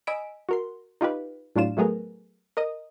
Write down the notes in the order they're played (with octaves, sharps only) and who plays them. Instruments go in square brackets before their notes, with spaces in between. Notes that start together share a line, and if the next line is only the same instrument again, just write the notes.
[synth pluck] D#5 G#5 B5 E6 B6 D7
F#4 A#4 C6
D#4 F4 G4 B4
A2 F#3 D4 F4 E7
F#3 A3 B3 G#4 A#4
A#4 D#5 D#6